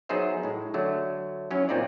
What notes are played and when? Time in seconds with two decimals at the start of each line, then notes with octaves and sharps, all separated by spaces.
0.09 F#3 B3 D#4 G#4 C5 E5
0.43 A2 G#3
0.74 D3 F#3 A3
1.51 F#3 C#4 E4 C#5
1.69 A#2 C4 D#4 F4 D5